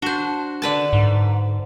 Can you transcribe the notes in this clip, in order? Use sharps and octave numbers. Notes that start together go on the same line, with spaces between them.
D4 F#4 C5
D3 B4 A5
G#2